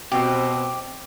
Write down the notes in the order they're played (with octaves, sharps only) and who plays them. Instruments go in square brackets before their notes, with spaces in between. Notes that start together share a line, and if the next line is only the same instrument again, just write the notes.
[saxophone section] B2 C4 [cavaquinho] G4